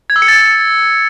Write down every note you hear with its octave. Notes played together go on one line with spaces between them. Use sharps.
G#6
E6
C#7
A6